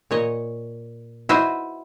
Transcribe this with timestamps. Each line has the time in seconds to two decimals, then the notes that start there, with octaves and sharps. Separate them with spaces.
0.11 A#2 C#5 D#5
1.29 E4 F#4 B4 C5 D#5